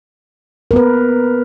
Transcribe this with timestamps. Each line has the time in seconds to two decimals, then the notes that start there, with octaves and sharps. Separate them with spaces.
0.71 A#4
0.73 B3
0.76 B4